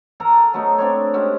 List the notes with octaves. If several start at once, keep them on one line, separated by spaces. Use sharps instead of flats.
A4 A#4 A5 A#5
F#3 A3 B3 D#4
C4 D4 C#5
G#3 C4 C#4 G4